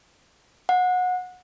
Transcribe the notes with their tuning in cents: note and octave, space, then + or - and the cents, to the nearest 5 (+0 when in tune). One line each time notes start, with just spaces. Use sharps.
F#5 -25